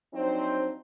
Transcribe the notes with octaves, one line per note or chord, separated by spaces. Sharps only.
F3 F#3 C4 D4 D#4 C5